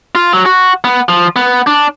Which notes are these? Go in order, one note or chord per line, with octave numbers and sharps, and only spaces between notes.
F4
F#3
F#4
B3
F3
B3
D4